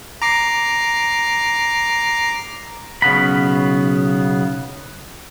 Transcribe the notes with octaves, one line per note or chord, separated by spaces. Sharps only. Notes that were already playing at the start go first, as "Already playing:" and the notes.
A#5 D6 C7
B1 C#3 B3 B5